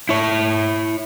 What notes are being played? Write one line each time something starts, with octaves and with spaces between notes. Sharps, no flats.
E4 C#5